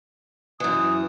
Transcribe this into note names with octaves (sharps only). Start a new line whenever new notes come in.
F#2 E3 D#6